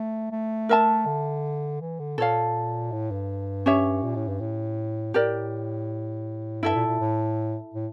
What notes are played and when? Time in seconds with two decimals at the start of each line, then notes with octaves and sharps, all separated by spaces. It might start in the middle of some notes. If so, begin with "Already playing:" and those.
Already playing: A3
0.32 A3
0.69 A#4 E5 A5
1.06 D3
1.81 E3
1.99 D3
2.18 A#2 A4 C#5 F5
2.92 A2
3.11 G2
3.66 C#4 G4 C#5 E5
4.03 A#2
4.15 A2
4.28 G2
4.40 A2
5.14 A2 G4 A#4 D5
6.63 G2 E4 A4 E5
6.75 A#2
6.87 A#2
7.00 A2
7.74 A2